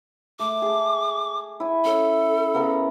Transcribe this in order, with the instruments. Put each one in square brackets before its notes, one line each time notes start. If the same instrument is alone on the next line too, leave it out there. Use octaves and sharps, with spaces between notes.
[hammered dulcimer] A3 [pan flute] D6
[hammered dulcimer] G#4 A5
E4 G#5
[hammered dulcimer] C#4 [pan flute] A4
[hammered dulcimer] C#3 B3 A#4